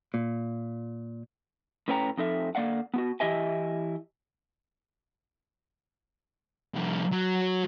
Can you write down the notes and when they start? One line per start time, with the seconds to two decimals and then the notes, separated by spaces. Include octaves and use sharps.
0.14 A#2
1.88 A2 C#4 B4 C#5 G5 A#5
2.17 F2 D#4 A4 E5
2.55 D3 A#3 D5 F5 F#5
2.94 B3 F4 F#4
3.20 E3 E4 G4 D#5 E5 G#5
6.74 C2 F3
7.12 F#3